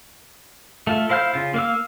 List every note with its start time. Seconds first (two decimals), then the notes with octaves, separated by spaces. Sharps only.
0.87 A3 F4
1.09 E4 C5 F5 F6 G6
1.34 C#3 F4
1.54 A#3 F5 E6